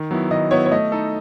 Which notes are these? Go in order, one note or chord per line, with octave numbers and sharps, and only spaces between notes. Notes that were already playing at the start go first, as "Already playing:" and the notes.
Already playing: D#3
F#3 B3 E4
D#3 D#5
F#3 B3 E4 C#5
C#5
A3 D#5
D#4 A4